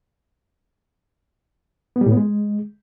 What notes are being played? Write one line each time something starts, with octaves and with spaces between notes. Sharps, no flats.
B3
G3
A2
B3
G#3